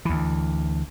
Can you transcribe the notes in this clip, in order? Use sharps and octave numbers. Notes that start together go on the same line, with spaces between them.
D2 E3